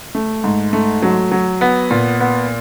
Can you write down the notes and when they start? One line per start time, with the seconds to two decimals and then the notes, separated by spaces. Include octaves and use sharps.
0.15 A3
0.44 G#2
0.73 A3
1.03 F#3
1.32 F#3
1.61 B3
1.91 A#2
2.20 B3